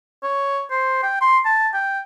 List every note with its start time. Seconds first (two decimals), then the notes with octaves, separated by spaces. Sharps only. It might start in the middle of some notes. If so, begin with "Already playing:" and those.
0.23 C#5
0.70 C5
1.03 G5
1.21 C6
1.45 A5
1.74 G5